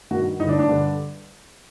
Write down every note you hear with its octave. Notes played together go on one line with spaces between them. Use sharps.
G2 D#3 F#4
G2 D3 D#4
D4
D4
G2 D3